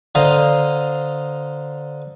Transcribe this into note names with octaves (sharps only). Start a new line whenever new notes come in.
D3 C5 D#5 F5 A#5